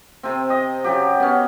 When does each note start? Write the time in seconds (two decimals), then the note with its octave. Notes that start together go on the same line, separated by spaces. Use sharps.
0.23 C3 C4
0.50 D#5
0.84 C#3 F#3 G4
1.20 B3 C#4